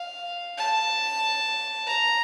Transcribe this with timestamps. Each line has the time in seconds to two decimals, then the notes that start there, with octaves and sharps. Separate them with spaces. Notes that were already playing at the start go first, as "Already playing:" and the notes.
Already playing: F5
0.58 A5
1.87 A#5